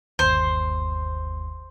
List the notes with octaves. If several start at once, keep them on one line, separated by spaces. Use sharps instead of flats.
G1 D#2 C5